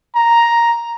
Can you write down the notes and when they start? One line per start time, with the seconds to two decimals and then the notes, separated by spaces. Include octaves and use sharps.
0.16 A#5